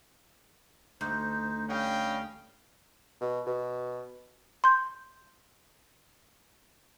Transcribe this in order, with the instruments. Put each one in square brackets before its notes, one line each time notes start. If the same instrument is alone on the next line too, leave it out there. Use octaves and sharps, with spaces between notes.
[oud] D2 [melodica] D#4 C5
[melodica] G3 D#5 [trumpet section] C#4 F5 G5
[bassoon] B2
B2
[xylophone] C6 G6